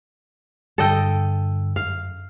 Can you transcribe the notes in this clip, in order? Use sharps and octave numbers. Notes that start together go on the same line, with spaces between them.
G2 D3 A4 D#5 G5 E6
F#2 F5